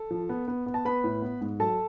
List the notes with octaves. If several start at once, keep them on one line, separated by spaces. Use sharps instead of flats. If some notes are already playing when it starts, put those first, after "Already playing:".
Already playing: A4
F3
B3
B3
B3
A5
B3 B4 B5
A2
B3
G#2
F#3 A4 A5